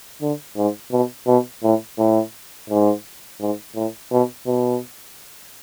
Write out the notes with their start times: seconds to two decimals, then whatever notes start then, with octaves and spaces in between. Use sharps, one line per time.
0.22 D3
0.57 G#2
0.92 B2
1.27 B2
1.63 A2
1.98 A2
2.70 G#2
3.40 G#2
3.75 A2
4.11 B2
4.47 B2